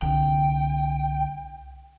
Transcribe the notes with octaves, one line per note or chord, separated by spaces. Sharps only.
C2 D3 G5